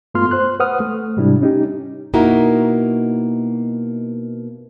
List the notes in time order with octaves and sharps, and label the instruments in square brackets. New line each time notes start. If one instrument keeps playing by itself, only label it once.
[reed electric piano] G2 A3 B3 F4 C6 F6
C5 C6 F#6
B4 C5 F#5 D#6 F6
A3
G#2 C3 G3 D4 E4
C#4 D#4 G4
[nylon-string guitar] B2 A#3 D#4 E4 F#4